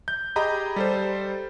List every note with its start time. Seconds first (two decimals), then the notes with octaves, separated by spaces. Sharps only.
0.08 G6
0.36 G4 G#4 D#5 A#5 B5 G6
0.76 G3 A4 C5